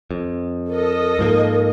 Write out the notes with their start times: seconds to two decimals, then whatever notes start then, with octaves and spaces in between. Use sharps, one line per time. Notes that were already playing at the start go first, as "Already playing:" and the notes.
0.11 F2
0.69 A4 A#4 D#5
1.19 G#2 F3 A#3